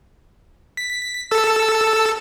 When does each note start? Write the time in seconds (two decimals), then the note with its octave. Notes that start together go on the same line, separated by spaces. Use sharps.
0.77 B6
1.31 A4 E6